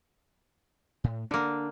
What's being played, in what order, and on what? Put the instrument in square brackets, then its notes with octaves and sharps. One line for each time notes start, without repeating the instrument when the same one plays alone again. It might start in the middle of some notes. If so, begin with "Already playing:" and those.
[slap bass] A2
[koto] D3 A#3 [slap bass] D4